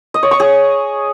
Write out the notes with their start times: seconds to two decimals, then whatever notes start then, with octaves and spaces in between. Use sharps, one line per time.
0.14 D#5
0.23 C#5
0.31 C#6
0.40 G#4